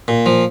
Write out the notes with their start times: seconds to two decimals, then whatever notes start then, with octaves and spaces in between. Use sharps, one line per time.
0.08 A#2
0.26 F3